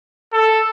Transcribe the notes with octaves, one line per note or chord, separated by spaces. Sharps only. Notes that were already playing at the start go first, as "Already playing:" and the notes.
A4